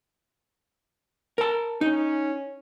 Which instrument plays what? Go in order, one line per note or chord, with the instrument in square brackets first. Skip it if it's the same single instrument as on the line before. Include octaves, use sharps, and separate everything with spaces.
[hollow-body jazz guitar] A#4 A5
[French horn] C#4 [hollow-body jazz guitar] D#4